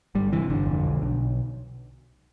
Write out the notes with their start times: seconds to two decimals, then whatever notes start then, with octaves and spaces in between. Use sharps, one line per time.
0.15 G1 G3
0.32 C3 E3
0.50 G1 D3
0.67 F2
0.85 B1
1.02 B1